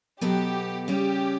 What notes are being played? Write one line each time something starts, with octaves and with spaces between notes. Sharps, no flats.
B2 F#3 B3 F#4 G4 A4
C#3 G3 C#4 G4